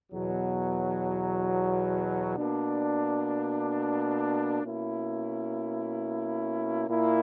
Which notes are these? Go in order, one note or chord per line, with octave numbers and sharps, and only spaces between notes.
E2 B2 F#3
B2 A#3 D4
B2 A#3 C#4 E4
A#2 A#3 E4